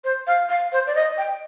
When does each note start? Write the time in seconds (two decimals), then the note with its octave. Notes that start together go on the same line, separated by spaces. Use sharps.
0.04 C5
0.27 F5
0.49 F5
0.73 C5
0.87 D5
0.95 D#5
1.18 G5